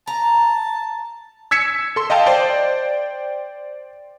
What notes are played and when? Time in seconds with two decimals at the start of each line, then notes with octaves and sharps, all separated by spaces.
0.07 A5 A#5
1.51 E6 G#6 B6 C#7 E7
1.96 A4 C6
2.10 D#5 F5 G5 A5
2.26 C5 D5 G5